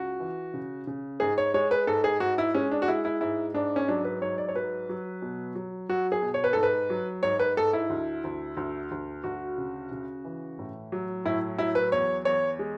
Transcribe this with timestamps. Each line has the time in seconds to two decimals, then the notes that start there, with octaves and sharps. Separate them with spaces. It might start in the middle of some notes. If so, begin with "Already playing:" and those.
Already playing: C#2 F#4
0.20 E3
0.54 C#3
0.87 C#3
1.20 G#2 G#4
1.38 C#5
1.54 G#3 C#5
1.71 B4
1.87 G#2 A4
2.04 G#4
2.20 G#2 F#4
2.38 E4
2.54 G#3 C#4
2.71 D4
2.82 F#4
2.88 G#3 E4
3.05 E4
3.21 G#2 E4
3.54 G#2 D4
3.76 C#4
3.88 F#3 D4
4.04 B4
4.21 G#2 C#5
4.38 D5
4.48 C#5
4.55 F#3 B4
4.89 F#3
5.22 B2
5.55 F#3
5.89 F#3 F#4
6.12 G#4
6.22 B2
6.34 C#5
6.44 B4
6.53 G#2 A4
6.63 B4
6.90 F#3
7.23 G#2 C#5
7.39 B4
7.57 G#2 A4
7.73 E4
7.90 D2
8.24 D2
8.57 D2
8.91 D2
9.24 D2 F#4
9.58 C#3
9.91 C#3
10.25 E3
10.59 A2
10.92 F#3
11.25 A2 E4
11.58 F#3 E4
11.75 B4
11.92 E2 C#5
12.25 E2 C#5
12.59 G#3